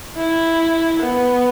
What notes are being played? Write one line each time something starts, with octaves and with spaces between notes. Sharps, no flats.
E4
B3